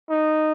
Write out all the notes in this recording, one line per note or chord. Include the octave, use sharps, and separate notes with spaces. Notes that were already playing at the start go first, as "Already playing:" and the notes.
D#4